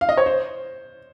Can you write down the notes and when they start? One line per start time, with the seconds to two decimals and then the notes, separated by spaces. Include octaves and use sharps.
0.01 F5
0.09 D#5
0.17 C#5
0.26 C5